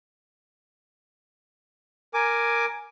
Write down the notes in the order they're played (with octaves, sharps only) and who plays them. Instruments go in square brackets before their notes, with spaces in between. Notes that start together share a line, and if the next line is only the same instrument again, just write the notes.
[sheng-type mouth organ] A#4 G#5 D6